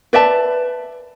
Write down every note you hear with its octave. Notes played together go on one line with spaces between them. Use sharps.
B4 D5 E5 A5